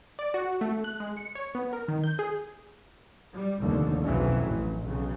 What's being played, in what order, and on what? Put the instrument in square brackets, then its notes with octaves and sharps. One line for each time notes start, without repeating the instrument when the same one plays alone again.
[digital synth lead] D5
F#4
A3
F#6
G#3
C#7
C#5
B3
A#4
D#3
G6
G#4
[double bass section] G3
F1 D#2 D3
B1 F2 C#3 E3 F#3
A1
B1 C#3